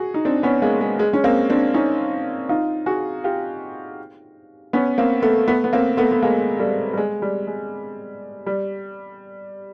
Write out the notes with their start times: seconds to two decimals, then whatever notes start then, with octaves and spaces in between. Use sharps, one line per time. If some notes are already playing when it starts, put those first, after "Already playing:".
Already playing: F#4 G#4
0.14 D#4
0.25 C4 D4
0.43 B3 C#4
0.62 G#3 A#3
0.81 G#3
0.99 G#3
1.13 C#4
1.24 A#3 C4
1.50 C4 D4
1.74 C#4 D#4
2.49 D#4 F4
2.86 F#4 G#4
3.24 F4 G4
4.73 B3 C#4
4.98 A#3 C4
5.22 A3 B3
5.48 A3 B3
5.64 B3
5.73 A#3 C4
5.97 A3 B3
6.12 B3
6.22 G#3 A#3
6.59 G3 A3
6.93 G3
6.97 G#3
7.22 G3
7.47 G#3
8.46 G3